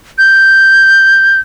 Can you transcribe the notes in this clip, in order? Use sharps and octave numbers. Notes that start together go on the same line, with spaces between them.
G6